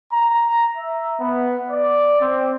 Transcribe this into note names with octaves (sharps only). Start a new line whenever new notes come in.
A#5
E5
B3
D5
C4